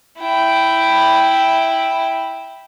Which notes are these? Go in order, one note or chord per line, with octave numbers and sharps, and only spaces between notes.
E4 G5